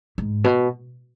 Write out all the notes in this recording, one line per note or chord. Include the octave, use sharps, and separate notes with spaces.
G#2
B2